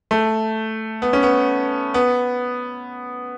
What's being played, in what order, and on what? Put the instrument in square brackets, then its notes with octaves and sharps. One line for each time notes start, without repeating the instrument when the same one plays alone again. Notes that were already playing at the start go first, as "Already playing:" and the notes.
[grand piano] A3
B3
C#4
B3
B3